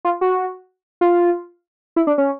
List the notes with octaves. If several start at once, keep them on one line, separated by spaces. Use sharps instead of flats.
F4
F#4
F4
E4
D4
C#4